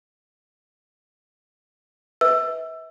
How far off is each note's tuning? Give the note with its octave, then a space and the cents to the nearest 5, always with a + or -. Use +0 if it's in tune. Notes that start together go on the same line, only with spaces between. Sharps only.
B4 +0 E5 -35 E6 +20